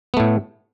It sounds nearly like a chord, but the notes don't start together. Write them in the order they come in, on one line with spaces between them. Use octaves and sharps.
B3 A3 A2